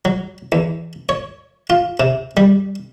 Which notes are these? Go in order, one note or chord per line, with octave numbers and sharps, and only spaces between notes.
F#3
E2
C#5
F4
C3
G3